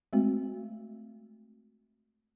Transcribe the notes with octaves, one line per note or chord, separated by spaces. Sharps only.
G#3 A3 C4 F#4